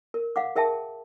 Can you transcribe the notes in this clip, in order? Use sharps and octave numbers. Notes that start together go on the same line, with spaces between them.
A#4
F5 F#5 D6
G#4 A#4 E5 G5 A5